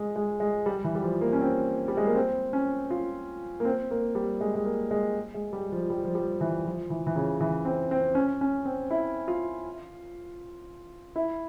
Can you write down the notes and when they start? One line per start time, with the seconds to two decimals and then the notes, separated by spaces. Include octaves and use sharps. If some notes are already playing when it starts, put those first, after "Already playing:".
Already playing: G#3
0.16 G#3
0.40 G#3
0.66 G3
0.84 E3
0.95 G3
1.02 F3
1.21 A#3
1.33 C#4
1.41 C4
1.88 G3
1.97 G#3
2.07 A#3
2.15 C4
2.53 C#4
2.90 F4
3.60 A#3
3.65 C4
3.91 A#3
4.15 G3
4.41 G#3
4.55 G#3
4.65 A#3
4.91 G#3
5.34 G#3
5.53 G3
5.72 F3
5.90 G3
6.05 F3
6.15 G3
6.41 E3
6.65 F3
6.90 E3
7.06 E3
7.16 C#3
7.40 E3
7.65 C4
7.91 C4
8.15 C#4
8.41 C#4
8.65 C4
8.91 E4
9.28 F4
11.16 E4